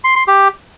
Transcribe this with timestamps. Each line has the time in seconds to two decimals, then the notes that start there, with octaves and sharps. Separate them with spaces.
0.04 C6
0.16 C6
0.27 G4